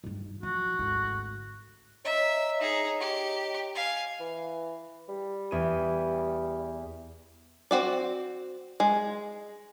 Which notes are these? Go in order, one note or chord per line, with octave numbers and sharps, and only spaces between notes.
G2 D#3
F3 F#4
G#1 D2
C#5 D#5 E5 A#5
D#4 G#4
G4
F5 G#5
E3
G3
E2 D#7
C4 F#4 D5
G#3